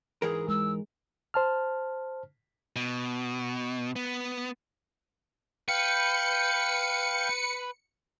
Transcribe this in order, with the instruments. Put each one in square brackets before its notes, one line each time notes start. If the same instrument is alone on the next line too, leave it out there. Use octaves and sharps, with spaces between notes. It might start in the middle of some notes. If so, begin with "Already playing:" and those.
[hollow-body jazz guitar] G#2 E3 A#4 [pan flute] G#4
[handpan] G#3 [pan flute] E6
[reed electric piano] C5 A5 F6
[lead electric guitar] B2
B3
[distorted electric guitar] B4 [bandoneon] F5 G5 G6 [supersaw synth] C#7